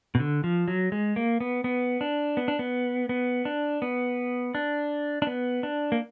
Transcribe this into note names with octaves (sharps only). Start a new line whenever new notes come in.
B2
D3
F3
F#3
G#3
A#3
B3
B3
D4
B3
D4
B3
B3
D4
B3
D4
D4
B3
D4
A#3